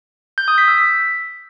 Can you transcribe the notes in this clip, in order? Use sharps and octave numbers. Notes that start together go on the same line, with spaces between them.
G6
D#6
B6
E6
B6